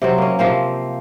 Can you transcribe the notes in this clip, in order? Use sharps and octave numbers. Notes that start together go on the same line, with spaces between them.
C3 F#3 C4
A#3 C#4
C3 F3 A#3 C4